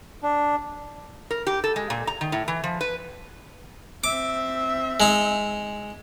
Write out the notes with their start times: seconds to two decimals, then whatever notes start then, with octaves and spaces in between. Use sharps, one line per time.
0.23 D4
1.31 A#4
1.47 G4
1.64 A4
1.76 G#3
1.90 A#2
2.07 A#5
2.21 D#3
2.32 A2
2.48 E3
2.64 F3
2.81 B4
4.04 C4 E5 D6
5.00 G#3 D#4